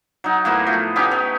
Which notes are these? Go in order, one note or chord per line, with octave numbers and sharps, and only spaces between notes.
F#3 D#4
A2 A#3 B3 F#4
F3 A3
B3 C#4 D#4 G4
B3